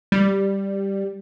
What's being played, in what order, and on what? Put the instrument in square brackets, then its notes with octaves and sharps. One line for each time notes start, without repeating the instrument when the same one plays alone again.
[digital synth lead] G3